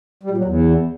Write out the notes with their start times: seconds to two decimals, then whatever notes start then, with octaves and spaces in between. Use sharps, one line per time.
0.23 G3
0.30 A#2
0.37 F#3
0.44 E2